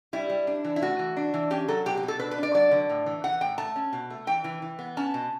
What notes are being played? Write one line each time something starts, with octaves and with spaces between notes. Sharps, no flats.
G3 E4
G3
D4
E3
E4
A3 F#4
E3
D4
E3
C#4 G4
F#3 A4
B2 G4
G4
B2
A4
D4 B4
B4
D4
D5
F#3 D5
D3
A2
E3
E3 F#5
A2 G5
A3 A5
C#4
B2
A3
E3 G5
E3
E3
B3
C#4 A5
B2